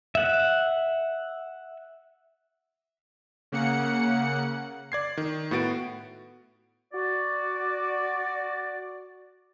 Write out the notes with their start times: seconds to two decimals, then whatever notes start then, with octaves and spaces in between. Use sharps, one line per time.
0.15 E5 F#5
3.52 C#3 A#3 F#5 C#7
4.92 D5 G#6 C7
5.17 D#3
5.51 A2 B3 F#4 A6 D7
6.93 F#4 D5